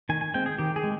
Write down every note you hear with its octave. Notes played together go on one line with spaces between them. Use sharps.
D#3 G#5
G#5
G#3 C4 G5
G#4
D#3 G4
G#4
G#3